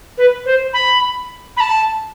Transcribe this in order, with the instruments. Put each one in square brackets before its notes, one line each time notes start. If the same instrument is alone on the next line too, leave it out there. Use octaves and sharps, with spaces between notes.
[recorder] B4
C5
B5
B5
A5